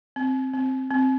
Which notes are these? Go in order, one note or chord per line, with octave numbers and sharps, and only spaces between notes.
C4
C4
C4